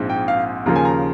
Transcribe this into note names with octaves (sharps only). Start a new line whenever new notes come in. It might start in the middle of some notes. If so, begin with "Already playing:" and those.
Already playing: A#1 G#2 F3 C4
G5
F5
D#2 C#3 F3 A#3 A#5
G#5
A#5